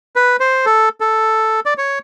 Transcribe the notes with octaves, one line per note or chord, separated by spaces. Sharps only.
B4
C5
A4
A4
D5
C#5